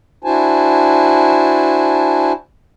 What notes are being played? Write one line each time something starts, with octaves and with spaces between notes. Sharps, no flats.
D4 E4 F#4 C5 G#5 A5